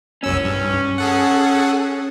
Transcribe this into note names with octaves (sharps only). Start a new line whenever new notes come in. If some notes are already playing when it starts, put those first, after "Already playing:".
C2 F#2 C#4 E6
G2
G#4 A4 F#5